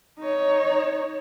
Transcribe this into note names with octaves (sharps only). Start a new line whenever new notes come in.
D#4 C#5